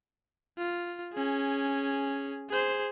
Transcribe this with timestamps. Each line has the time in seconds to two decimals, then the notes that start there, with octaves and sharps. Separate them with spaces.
0.58 F4
1.14 C#4 G#4
2.50 G#4 C5